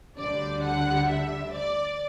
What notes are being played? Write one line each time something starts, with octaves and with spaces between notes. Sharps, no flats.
D2 D3 G3 D4 D5
F#5
E5
D5